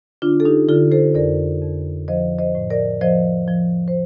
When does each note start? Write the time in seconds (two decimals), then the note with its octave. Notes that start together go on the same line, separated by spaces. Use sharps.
0.22 D3 D4 F4
0.40 A4
0.45 D#4 G4
0.69 D3 F4 A4
0.91 A4 C5
1.14 F2 A#4 D5
1.62 F2
2.08 F3 C5 D#5
2.39 C5 D#5
2.55 A2
2.70 A#4 D5
3.01 F3 C5 D#5
3.48 F3
3.88 C5